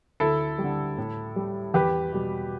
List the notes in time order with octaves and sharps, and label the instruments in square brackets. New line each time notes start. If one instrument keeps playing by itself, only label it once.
[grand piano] D2 E4 A4
D3 G3
A2
G3
E2 G4 B4
B2 G3